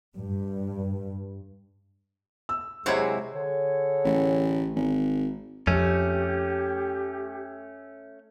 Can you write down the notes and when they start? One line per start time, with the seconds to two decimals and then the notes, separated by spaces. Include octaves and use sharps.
0.18 G2
2.49 E6
2.86 C3 F#3 G#3 E4 C5 G#6
3.33 D3 G#4 C#5
4.04 A1
4.76 G#1
5.67 F2 A3 C#4 G4